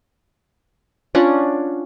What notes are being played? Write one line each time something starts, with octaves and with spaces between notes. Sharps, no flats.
C#4 D4 F4 F#5